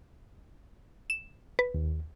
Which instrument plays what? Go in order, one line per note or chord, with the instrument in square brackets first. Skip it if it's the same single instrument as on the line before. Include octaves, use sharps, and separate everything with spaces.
[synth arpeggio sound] E7
B4
[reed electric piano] D#2